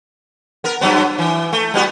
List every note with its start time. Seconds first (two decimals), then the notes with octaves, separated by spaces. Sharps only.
0.64 B3 A#4
0.81 G2 F#3 B3
1.19 E3
1.53 A3
1.74 G3 B3 F#4